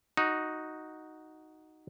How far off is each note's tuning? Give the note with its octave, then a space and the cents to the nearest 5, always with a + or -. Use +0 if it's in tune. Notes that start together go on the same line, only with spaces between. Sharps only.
D#4 +0 F#4 +0